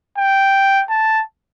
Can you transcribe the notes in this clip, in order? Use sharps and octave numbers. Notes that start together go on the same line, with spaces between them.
G5
A5